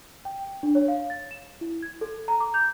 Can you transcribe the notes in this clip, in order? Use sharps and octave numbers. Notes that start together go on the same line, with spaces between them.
G5
D4
C#5
F5
A6
E7
E4
G#6
A4
A#5
D6
G6